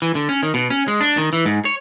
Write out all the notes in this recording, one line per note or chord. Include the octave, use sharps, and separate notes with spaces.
E3
D3
C#4
D#3
B2
C#4
G#3
D4
D#3
E3
G#2
C#5